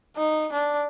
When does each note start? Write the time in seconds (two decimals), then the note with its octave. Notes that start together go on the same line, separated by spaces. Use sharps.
0.17 D#4
0.52 D4